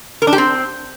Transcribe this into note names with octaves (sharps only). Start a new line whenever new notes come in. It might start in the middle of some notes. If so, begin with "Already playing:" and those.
A#4
D4
G4
C4